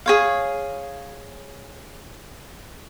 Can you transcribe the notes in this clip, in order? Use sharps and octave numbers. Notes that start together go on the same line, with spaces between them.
G#4 C#5 F5